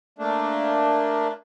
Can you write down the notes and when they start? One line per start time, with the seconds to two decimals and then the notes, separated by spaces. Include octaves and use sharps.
0.19 A3 A#3 D4